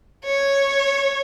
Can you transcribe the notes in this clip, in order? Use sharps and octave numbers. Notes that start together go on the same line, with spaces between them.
C#5